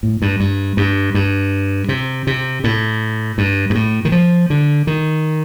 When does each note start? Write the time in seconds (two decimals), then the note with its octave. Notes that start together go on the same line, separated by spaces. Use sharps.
0.03 A2
0.22 G2
0.40 G2
0.77 G2
1.14 G2
1.89 C3
2.27 C3
2.64 A2
3.38 G2
3.70 G2
3.75 A2
4.05 D#3
4.12 F3
4.50 D3
4.87 D#3